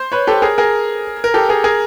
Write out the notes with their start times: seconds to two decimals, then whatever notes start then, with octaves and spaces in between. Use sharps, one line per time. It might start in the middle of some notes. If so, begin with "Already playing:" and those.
Already playing: C5
0.12 B4 C#5
0.27 G4 A4
0.42 G#4 A#4
0.58 G#4 A#4
1.24 A#4
1.34 G4 A4
1.49 G#4 A#4
1.64 G#4 A#4